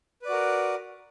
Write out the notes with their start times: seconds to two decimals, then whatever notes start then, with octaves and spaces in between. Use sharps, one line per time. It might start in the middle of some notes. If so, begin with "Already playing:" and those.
0.22 B4
0.25 D5
0.29 F#4
0.32 A#4